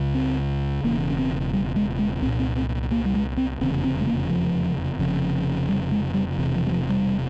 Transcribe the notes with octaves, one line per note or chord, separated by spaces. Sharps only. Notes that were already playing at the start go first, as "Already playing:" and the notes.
Already playing: C#2 C#3
C4
E1 E2 C#3 A#3
C#4
C4
G3
G#3
G#3
C2 A#2 C4
C4
C4
A#3
G3
G#3
C4
F1 E2 C#3 C4
C4
G#3
A#3
F3
F1 F2 C#3
G3
G#3
G3
E1 E2 C3
F3
G3
F3
G3